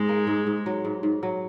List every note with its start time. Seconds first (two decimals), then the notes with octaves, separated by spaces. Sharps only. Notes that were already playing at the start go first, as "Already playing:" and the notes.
Already playing: G#2 G#3
0.09 A#3
0.27 G#2
0.47 G#2
0.66 F#3
0.85 G#2
1.03 G#2
1.23 F#3